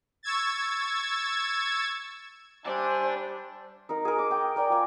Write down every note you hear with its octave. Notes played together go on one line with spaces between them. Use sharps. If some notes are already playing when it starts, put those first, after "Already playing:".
C#6 E6 G#6 A6
G3 D4 C5 D5 E5 G#5 A5
D#4 A#4
G#4 A#4
D6
G5
A#4 D5 G5 G#5
F4 G#5